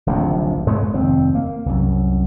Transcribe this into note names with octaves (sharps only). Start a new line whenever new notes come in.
D1 A#1 D#2 C3
G#2 G#3 A3 B3
F1 D#2 C4
A#3
C2 F#2